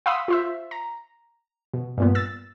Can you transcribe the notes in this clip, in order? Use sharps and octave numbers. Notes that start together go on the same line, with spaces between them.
F5 F#5 B5 C6 D#6 E6
F4 C5 E5
A#5
B2
G2 A#2 B3
E6 A6